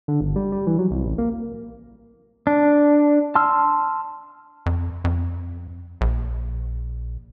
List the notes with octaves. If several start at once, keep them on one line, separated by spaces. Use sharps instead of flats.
D3
G1
G3
G3
E3
F#3
C2
A1
A#3
D4
A5 C6 E6 F6
F2
F2
A#1